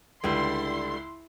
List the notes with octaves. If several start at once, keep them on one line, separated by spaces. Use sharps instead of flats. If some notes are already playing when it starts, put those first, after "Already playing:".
C#2 D3 G3 E4 C6